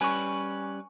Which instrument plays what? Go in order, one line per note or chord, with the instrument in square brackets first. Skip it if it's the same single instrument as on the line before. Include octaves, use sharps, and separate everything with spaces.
[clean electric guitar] G3 C#4 B4 [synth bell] G#5 C#6